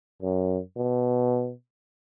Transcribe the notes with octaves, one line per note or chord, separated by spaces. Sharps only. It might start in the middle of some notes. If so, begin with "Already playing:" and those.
F#2
B2